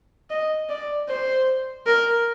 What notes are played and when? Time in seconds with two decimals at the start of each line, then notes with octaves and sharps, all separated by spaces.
0.30 D#5
0.69 D5
1.09 C5
1.86 A#4